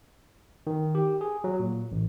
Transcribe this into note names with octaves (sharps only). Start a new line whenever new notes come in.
D#3
G4
G#4
F#3
A#2
A1